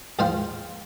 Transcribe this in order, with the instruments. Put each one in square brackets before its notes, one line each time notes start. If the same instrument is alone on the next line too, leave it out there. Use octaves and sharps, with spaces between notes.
[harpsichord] D#2 G#2 F3 F5 G5 C6